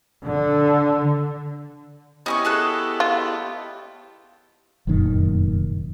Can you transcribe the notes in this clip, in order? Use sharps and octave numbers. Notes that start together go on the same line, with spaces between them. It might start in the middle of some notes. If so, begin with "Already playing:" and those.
D3
B3 C#4 E4 G4 C#5 D#5 G#5 C#6
G#4 A4 F#6
F4
F1 F#2 A#2 D#3